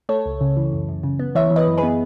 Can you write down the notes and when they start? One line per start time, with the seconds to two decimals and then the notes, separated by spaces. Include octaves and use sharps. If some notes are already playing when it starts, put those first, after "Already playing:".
0.09 A3 A4 C#5
0.26 C#2
0.41 C#3
0.57 E3
0.73 F#2
0.89 F#2
1.03 C#3
1.19 B3
1.35 E3 C#5 E5
1.51 E3
1.56 B4 D#5
1.67 F#2
1.78 G#4 B4
1.83 B3